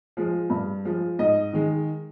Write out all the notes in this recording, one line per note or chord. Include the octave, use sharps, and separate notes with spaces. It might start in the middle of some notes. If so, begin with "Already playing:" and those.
F3 G#3
G2
F3 G#3
G#2 D#5
D#3 G#3